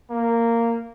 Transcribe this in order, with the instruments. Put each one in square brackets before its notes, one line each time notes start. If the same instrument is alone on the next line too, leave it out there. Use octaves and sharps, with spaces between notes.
[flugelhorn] A#3